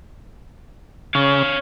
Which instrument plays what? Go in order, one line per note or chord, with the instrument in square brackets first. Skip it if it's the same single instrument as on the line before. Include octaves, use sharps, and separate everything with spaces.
[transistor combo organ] C#3 [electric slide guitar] C#5 F5